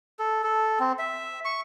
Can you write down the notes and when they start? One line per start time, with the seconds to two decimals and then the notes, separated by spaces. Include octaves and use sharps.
0.19 A4
0.43 A4
0.80 C4
0.99 E5
1.45 C#6